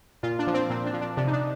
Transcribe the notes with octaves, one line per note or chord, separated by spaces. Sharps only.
A#2 F4
D4
F3
C4
A#2 C4
D4
F3
D4
C3 D4
D#4
D4